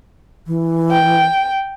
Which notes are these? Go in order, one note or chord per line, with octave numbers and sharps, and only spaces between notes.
E3
G5